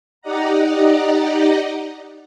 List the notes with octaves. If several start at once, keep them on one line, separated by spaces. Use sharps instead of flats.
D#4 G4 D5 D#5 F#5 A#5